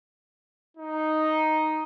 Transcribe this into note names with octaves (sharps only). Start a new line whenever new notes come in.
D#4